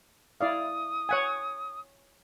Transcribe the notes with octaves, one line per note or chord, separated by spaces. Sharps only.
E4 D5 F5 D#6
C#5 F#5 G#5